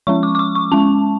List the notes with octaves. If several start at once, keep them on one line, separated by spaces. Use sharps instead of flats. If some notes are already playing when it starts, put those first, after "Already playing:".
F3 G#3 C#4 C#6
D6
D6
C#6
C#6
G#3 C#4 A5